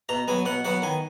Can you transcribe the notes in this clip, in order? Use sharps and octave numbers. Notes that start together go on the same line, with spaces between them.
B2 A#5
F#3 B3 G#5
B2 F#5
F#3 B3 F#5
D#3 G#5